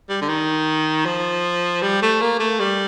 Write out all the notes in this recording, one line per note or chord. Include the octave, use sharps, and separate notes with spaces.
G3
D3
D#3
F3
G3
A3
A#3
A3
G3